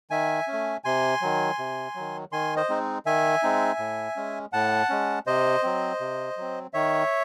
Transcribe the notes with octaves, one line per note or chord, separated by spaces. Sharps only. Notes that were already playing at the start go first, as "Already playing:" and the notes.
D#3 E5 G#5
A3 C#4
C3 G#5 C6
D#3 F#3
C3
D#3 F#3
D#3 G#5 C6
C5 D#5
G#3 C4 D#4
D#3 E5 G#5
G#3 C4 D#4
A2
G#3 C#4
A2 F#5 A5
G#3 C#4
C3 C5 D#5
F#3 C4
C3
F#3 C4
D#3 C#5 E5